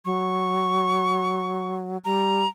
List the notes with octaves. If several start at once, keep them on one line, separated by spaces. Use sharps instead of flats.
F#3 C#6
G3 A#5